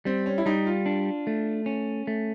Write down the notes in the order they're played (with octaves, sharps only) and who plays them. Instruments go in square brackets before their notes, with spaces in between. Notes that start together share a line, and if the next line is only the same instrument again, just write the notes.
[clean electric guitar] G3 [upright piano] C4
[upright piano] C#4
E4
[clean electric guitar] G3 [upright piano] D#4
[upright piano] F4
[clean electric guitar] D4
A3
C#4
A3